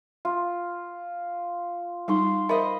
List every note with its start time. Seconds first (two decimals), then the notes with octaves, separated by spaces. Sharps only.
0.25 F4
2.08 G3 D#4 F5 F#5 C6
2.49 A#4 C5 D#5 E5 B5